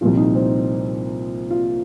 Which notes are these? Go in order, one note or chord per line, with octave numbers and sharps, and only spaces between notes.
C2 A#2 F3 F4
D#4
C4
F4